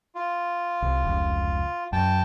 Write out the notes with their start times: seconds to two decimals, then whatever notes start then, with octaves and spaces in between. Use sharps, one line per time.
0.15 F4
0.82 C2
1.04 F1 C#2
1.93 F#2 G5 A5